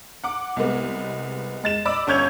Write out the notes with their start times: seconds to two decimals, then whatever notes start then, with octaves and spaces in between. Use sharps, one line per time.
0.24 F#5 D6
0.57 C2 G#3 B3
1.64 G#3 A6 E7
1.85 D5 D#5 B5 D6 E6
2.07 G1 C#4 C#6 G6 G#6 F7